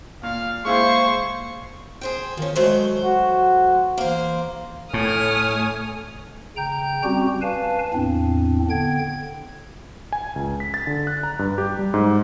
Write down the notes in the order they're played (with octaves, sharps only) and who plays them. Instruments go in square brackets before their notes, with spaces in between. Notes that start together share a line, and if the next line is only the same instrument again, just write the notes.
[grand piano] A#2 [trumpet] F5
[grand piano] G#3 E4 G#4 [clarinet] A#3 [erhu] C5 [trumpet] C#6
[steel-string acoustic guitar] G#4 C5 G5
[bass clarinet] D#3 [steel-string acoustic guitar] F3 C#4
[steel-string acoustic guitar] F#3 A3 C5 [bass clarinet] G#3
[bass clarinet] F#4
[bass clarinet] E3 [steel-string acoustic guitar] A#3 C5
[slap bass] A2 [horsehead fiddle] A3 [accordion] C#5 G#5 [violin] D#6 F6
[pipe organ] C#3 G5 A#5 G6
G3 C4 C#4 F#4 G4
B4 F5 G#5 A5
E2 A2 C4 D4
D3 B3 G5 G#6
[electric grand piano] G#5
C#2
B6
A6
D3
F#6
A#5
G2
G4
G3
G#2